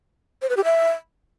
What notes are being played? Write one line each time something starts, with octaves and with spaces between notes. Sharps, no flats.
C5
B4
G4
E5